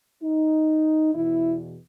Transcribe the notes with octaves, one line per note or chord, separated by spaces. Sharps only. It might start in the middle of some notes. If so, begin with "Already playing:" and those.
D#4
E2 B2 E4